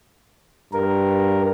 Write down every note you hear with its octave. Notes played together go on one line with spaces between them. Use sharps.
G2 A#4